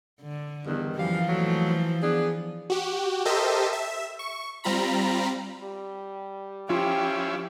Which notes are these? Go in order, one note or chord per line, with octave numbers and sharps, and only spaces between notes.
D3
E2 G2 D#3
F#2 E3 F3 G3 F5
D#2 F#3 A3
B3 D4 G#4
F#4 G4
G4 A4 A#4 C5 D#5 E5
E5
C#6
G3 C4 F4 A#5 B5
G3
F3 C#4 E4 F4 G4 F5 G5